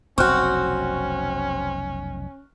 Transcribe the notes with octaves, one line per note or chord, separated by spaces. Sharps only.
F1 B1 C4 C#4 F#4 C#6 F6 F#6